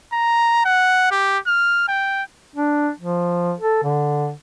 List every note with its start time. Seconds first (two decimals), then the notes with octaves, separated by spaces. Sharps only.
0.13 A#5
0.65 F#5
1.11 G4
1.47 F6
1.88 G5
2.56 D4
2.99 F3
3.60 A4
3.83 D3